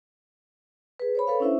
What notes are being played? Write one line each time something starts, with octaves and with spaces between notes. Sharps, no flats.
G#4 B4
C5 C#5 B5
A4 B4 C#5 F5
C#4 D4 E4 C5 E5